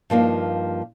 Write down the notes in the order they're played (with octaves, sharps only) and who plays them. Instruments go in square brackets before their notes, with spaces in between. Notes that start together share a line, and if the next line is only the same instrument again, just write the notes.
[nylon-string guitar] G2 F3 A#3 D#4